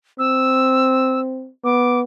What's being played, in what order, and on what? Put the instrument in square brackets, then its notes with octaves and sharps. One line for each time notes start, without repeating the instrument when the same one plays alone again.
[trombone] C4 [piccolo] E6
[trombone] B3 [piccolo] D6